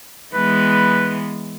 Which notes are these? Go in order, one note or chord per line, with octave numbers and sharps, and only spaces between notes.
E3 G#3 B3 B4